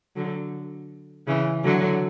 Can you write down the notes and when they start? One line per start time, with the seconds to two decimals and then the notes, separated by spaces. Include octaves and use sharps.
0.16 D3 F#3
1.27 C#3 E3
1.64 D3 F#3